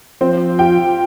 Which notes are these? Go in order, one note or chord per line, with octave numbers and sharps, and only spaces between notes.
F3 C4 C5
F4 G4 G5